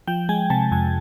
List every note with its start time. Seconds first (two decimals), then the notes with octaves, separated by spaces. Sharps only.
0.08 F3 G5
0.29 G#3 G#5
0.50 C3 A5
0.71 F2 G#5